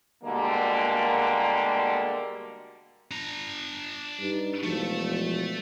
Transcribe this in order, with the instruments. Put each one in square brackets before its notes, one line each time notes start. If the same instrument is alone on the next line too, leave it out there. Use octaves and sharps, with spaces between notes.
[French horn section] B2 D3 G3 G#3 A#3
[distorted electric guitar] D4 A#5
[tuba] G2 [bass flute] D#4
[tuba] E1 [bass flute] F3 [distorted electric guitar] A3